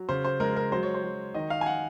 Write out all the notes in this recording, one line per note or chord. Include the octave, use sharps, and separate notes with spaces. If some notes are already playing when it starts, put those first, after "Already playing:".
Already playing: F#3
C#3 C5
C5
G#3 A#4
A#4
F#3 C5
C#5
C5
F#3
D#3 D#5
F5
G#5
F#5